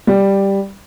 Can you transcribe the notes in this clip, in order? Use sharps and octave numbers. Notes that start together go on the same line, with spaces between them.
G3